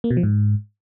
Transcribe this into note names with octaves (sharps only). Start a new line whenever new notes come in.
A#3
B2
F3
G#2